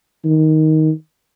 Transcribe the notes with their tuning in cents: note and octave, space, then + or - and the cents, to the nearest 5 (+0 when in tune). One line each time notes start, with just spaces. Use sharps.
D#3 +10